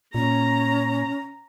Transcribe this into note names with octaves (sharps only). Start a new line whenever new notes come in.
A#2 C#4 A#5